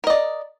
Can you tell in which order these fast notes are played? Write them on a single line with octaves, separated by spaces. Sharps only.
A#4 D#5 D5